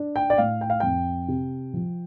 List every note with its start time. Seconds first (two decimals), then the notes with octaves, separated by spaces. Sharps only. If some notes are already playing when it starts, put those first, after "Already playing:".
Already playing: D4
0.16 G5
0.30 D5
0.38 A2 F5
0.61 G5
0.70 F5
0.80 F2 G5
1.28 C3
1.74 F3